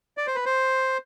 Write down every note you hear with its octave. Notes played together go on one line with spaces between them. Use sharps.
D5
C5
B4
C5